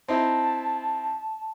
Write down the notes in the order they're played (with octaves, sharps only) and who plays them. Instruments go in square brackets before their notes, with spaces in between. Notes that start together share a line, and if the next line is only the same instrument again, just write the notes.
[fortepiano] C4 D#4 E4 [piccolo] A5